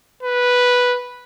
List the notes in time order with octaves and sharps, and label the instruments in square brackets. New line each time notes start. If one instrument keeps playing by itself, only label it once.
[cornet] B4